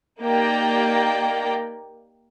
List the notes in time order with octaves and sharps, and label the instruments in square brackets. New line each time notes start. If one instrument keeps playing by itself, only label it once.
[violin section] A#3 D#4 G4 A#4 D5 G5